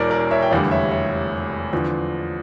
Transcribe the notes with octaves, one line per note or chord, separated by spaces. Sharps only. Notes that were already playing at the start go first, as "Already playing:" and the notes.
Already playing: E1 E2 E3 A#4 C#5 D5
A#4 D5
C#5 E5
G5
F1 E2 D3 G3 D5 F5
C#5 E5
C#5 E5
E2 D3 F3